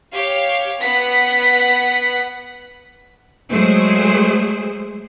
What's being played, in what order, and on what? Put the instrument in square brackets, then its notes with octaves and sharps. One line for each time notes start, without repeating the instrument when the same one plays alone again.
[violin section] G4 C#5 F5
B3 F#5 B6
[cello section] F#3 G#3 A3 G#4 C5